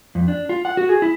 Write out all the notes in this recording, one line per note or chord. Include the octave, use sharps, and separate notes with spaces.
F2
D4
F4
F#5
F#4
G#4
E4